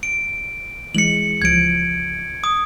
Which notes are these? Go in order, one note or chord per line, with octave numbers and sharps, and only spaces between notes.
D7
E3 G#3 C#7 F#7
C#2 F3 G#6 D7
D#6